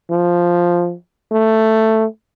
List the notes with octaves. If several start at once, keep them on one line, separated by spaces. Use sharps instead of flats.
F3
A3